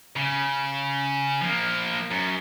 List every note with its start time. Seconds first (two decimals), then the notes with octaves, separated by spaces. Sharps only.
0.16 C#3
1.41 F3 A#3
2.10 F#2